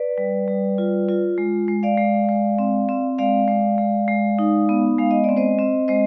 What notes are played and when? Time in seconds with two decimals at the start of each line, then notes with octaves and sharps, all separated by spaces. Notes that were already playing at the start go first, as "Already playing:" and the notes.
Already playing: B4 D5
0.18 G3
0.48 G3
0.78 F4
1.09 F4
1.38 G#3
1.68 G#3
1.83 D5 F5
1.98 G#3
2.29 G#3
2.58 C4
2.89 C4
3.18 G#3 D5 F5
3.48 G#3
3.78 G#3
4.08 G#3
4.39 D#4
4.69 B3
4.98 G#3 F5
5.11 D#5
5.24 C4 D5
5.37 C5 D#5
5.59 C4
5.88 G#3 C5 D#5